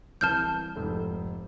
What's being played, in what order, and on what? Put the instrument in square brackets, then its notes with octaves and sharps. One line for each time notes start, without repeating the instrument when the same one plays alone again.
[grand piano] C2 E3 G7 [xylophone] A5 F6 G6
[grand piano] F1 G#2 A4